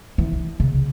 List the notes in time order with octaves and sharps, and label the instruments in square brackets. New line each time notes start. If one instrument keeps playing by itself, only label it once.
[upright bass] E3
C#3